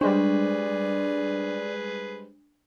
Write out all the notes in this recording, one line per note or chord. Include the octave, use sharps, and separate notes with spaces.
G3 G#3 D4 G#4 B4 C5 D5